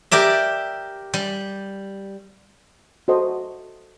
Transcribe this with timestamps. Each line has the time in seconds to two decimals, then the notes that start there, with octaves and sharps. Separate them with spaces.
0.11 G4 A#4 D5 E5
1.14 G3
3.08 F#4 A4 C5 D#5